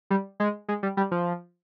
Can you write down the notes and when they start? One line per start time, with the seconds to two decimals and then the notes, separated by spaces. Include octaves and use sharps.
0.10 G3
0.40 G#3
0.68 G#3
0.83 G3
0.97 G3
1.11 F3